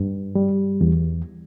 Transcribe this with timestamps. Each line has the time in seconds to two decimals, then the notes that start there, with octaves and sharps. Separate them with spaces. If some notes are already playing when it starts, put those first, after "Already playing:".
Already playing: G2
0.35 G3
0.81 E2